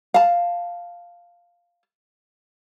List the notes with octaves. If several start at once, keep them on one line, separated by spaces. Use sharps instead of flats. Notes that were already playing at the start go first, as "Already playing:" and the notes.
F5 A5